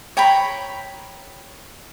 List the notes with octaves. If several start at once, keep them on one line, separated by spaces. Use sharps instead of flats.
C#5 G5 A#5 B5